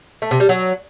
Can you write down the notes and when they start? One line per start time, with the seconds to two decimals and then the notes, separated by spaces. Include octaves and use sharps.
0.22 A3
0.31 C3
0.40 G3
0.49 F#3